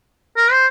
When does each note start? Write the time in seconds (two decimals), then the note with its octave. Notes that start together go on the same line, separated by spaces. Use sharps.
0.37 A#4
0.51 C5